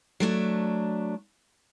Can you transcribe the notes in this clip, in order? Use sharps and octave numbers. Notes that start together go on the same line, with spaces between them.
F#3 A3 D4